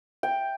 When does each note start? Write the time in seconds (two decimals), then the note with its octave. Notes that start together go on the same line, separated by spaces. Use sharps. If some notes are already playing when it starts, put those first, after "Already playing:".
0.23 G5